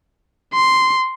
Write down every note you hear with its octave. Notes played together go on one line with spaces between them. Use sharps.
C6